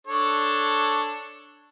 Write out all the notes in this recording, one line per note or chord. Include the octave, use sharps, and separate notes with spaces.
D4 A4 C#5